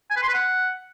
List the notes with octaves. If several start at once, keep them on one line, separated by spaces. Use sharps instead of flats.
G#5
B4
C6
B4
F#5